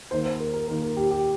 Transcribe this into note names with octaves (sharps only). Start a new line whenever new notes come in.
D#3 A#3 C5
C5
A#4
A#4
D#3 A#3 A#4
A#4
G4
G4